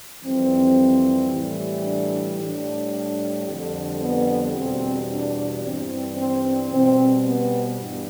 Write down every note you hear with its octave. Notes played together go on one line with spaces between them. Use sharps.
F2 E3 G3 C4
A2 E3 G3
D4
A2 G3 D4
F2 D3 G3
B3
E2 B2 G3 C4
D4
G2 E3 G3 C4
C4
B2 G3 C4
B3
G2 E3